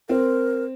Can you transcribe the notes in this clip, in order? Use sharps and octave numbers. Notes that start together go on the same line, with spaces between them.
C4 A#4